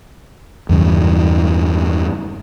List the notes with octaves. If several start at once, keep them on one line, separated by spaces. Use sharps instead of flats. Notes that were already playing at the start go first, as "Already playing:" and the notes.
E2 G2 C#3